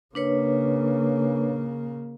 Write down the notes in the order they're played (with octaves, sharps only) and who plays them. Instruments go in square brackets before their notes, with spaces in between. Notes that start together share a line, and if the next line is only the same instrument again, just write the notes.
[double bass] C#3 A#3 [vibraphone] D4 B4 C#5